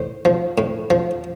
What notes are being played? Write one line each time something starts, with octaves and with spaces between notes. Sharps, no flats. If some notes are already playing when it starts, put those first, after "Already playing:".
Already playing: A2 C5
F3
A2
F3